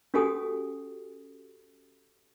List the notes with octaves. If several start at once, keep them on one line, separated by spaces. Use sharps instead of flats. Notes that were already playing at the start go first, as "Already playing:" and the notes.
C#4 F#4 G4 A4 G#5 D#6